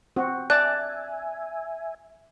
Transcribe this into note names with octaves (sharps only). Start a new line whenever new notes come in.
C4 F#4
D5 E5 G#5 A5 F#6